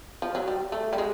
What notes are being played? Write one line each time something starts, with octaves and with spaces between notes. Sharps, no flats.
F3
F#3
G3
A3
G3
G#3